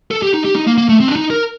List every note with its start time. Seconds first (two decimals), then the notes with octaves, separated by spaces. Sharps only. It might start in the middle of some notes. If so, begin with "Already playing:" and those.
0.11 A4
0.22 G4
0.34 D#4
0.45 G4
0.55 D#4
0.67 A#3
0.78 A#3
0.89 A3
1.00 C4
1.08 D4
1.16 D#4
1.30 A#4